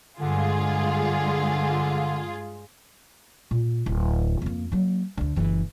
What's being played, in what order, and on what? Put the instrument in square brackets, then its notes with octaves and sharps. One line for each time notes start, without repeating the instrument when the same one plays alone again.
[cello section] G2 G#3 [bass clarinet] D3 [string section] F4 G#4
[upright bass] A#2
D1
F2 A#3
F#3 A#3
D2 D3
F#1 E3